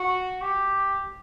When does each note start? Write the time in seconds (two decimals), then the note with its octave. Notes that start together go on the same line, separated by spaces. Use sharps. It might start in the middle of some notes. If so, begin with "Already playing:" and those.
Already playing: F#4
0.42 G4